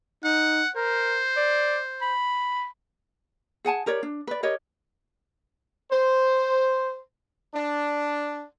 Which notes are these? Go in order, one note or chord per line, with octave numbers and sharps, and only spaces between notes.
D#4 F#5
A#4 C5
D5
B5
G#4 F#5 G#5 A5
G4 A#4 C#5 D5
D4
B4 D5
G4 A#4 C#5 D#5
C5
D4